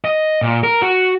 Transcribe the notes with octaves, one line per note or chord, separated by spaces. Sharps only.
D#5
A#2
A#4
F#4